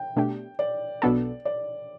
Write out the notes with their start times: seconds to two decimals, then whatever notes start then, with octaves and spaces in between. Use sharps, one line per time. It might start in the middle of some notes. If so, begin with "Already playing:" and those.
Already playing: G5
0.16 B2 A3 D4 G4
0.59 D5
1.02 B1 B2 B3 D4 A4
1.45 D5